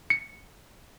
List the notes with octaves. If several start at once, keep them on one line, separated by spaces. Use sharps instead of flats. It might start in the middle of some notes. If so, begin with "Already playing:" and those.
C#7